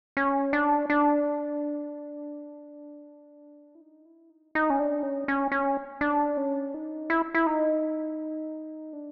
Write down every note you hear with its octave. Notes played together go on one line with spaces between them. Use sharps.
C#4
D4
D4
E4
D#4
E4
D#4
D#4
C#4
D4
C#4
C#4
C#4
D4
C#4
D#4
E4
E4
D#4
D4